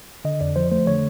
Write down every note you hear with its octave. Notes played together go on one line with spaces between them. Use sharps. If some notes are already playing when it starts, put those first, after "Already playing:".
D3 D#5
F2 D5
F3 C5
A3 C5
D3 C#5